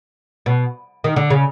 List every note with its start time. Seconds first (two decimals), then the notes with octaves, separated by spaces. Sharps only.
0.46 B2
1.04 D#3
1.16 D3
1.30 C#3